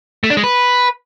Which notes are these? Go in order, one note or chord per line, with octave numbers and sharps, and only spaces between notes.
A3
D4
G#3
B4